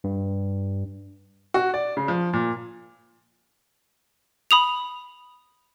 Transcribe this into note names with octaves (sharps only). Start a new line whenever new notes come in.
G2
F#4
D5
C#3
F3
A#2
B5 D#6 F7